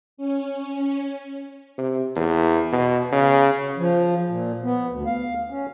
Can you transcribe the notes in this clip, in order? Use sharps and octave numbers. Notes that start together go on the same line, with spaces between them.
C#4
C3
E2
B2
C#3
F3
A#2
B3
D2
F5
C#4